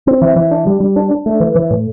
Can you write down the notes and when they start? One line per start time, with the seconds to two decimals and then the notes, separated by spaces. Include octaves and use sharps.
0.07 C4
0.21 E3
0.36 E3
0.51 D4
0.67 G3
0.80 G3
0.96 D4
1.11 D4
1.26 A3
1.40 E3
1.55 E3
1.71 A2